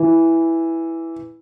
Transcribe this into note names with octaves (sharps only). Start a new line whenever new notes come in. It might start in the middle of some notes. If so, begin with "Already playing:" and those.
Already playing: E3